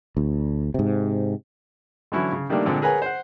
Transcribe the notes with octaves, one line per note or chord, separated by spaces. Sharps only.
D2
G#2 C3
D3 E3 F#3 C#4 E4
C#3
D#3 G3 A3 A#3 D4
A#2 D3 G#3 C4
G#4 A#4 B4 C#5 F#5 G#5
C5 F#5